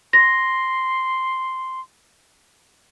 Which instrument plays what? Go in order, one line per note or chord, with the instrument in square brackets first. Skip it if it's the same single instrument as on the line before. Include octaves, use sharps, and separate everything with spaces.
[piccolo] C6 [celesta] A#6